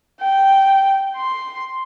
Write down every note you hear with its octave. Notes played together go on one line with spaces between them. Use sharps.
G5
C6